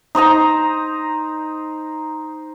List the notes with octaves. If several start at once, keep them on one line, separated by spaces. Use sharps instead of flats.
D#4 C5 D#5 A#5